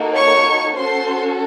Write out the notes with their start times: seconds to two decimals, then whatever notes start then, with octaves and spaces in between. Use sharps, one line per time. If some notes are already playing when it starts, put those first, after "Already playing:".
Already playing: A#3 D#4 F#4 A4
0.16 C#5 C#6
0.76 C#4 F#4 A4 C5 C6